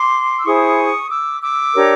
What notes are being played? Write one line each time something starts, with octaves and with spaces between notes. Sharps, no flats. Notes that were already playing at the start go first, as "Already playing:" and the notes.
Already playing: C6 D6
E6
E4 G#4 C5 C#6 D#6
D6 E6
D6 E6
D4 G4 A#4 C#5